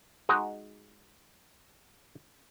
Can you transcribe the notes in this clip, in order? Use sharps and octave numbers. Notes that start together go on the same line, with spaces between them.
G#3 D#4 F#4